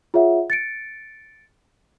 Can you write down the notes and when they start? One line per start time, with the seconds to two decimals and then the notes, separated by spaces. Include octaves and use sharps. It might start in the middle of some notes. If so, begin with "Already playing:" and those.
0.14 F4 G#4 C#5 E5 F#5
0.50 A6 C#7 D7